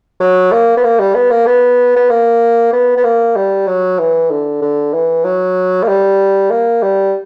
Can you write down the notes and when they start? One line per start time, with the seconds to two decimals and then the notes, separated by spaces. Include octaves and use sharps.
0.20 F#3
0.52 A#3
0.77 B3
0.84 A#3
1.00 G3
1.15 B3
1.30 A#3
1.46 B3
1.96 B3
2.10 A#3
2.73 B3
2.97 B3
3.04 A#3
3.36 G3
3.67 F#3
3.99 E3
4.30 D3
4.62 D3
4.94 E3
5.24 F#3
5.83 A#3
5.88 G3
6.51 A#3
6.83 G3